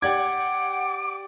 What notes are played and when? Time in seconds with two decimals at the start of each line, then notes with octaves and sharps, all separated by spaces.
0.02 G4 D5 F#5 D6 G#6